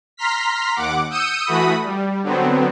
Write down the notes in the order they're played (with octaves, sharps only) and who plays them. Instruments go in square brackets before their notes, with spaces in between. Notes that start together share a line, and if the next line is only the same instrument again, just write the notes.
[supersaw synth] A#5 C6 F6 B6
D#2 F#5 D6
D#6 E6 G6 C#7 D#7
E3 A3 F#4 B5 D#6
G3
D3 F#3 B3 C4